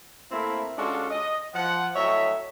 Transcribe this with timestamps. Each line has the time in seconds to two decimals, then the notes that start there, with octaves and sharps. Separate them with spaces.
0.31 A3 A#3 C4 E4
0.78 G#3 C#4 D4 F4 F#4 A4
1.11 D#5
1.55 F3 F#5
1.96 A2 F#3 C#5 D#5 E5